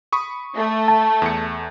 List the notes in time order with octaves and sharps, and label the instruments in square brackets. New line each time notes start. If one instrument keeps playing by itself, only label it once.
[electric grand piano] B5 C#6 D#6
[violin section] A3
[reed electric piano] A5
[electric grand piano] E2 C#7